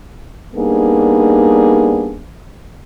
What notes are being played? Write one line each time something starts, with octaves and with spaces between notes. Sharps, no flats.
G3 A#3 B3 D4 D#4 G#4